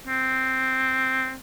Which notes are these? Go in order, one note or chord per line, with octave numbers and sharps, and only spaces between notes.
C4